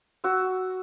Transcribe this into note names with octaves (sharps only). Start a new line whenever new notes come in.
F#4 E6